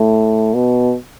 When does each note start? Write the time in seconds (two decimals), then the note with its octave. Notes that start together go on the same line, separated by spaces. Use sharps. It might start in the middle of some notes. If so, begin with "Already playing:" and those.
Already playing: A2
0.54 B2